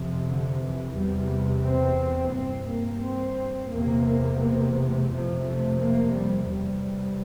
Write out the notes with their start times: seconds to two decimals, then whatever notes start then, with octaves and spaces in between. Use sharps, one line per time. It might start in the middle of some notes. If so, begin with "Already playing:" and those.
Already playing: F2 C3
0.27 D3
0.62 E3
0.96 E2 C3 G3
1.66 C4
2.34 G2 C4
2.69 A#3
3.03 C4
3.72 E2 C3 A#3
4.41 A#3
4.76 A3
5.11 F2 C3 F3
5.45 A3
5.80 A#3
6.14 G3
6.49 E2 C3 G3